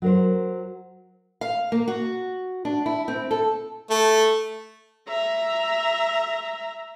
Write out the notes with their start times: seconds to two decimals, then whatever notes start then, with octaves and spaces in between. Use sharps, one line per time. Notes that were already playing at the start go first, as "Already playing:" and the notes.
0.02 F#3 A#4 C5
1.41 F5
1.72 A#3
1.88 F#4
2.65 D4
2.86 E4
3.08 C4
3.31 A4
3.90 A3
5.09 E5 A#5